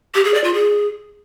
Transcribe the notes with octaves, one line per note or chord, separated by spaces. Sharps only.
G4
G#4
D5
F4
G#4